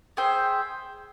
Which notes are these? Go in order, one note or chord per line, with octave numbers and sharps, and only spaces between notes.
G#4 C5 E5 G5